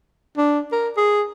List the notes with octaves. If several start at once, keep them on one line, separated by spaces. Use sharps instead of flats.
D4
A#4
G#4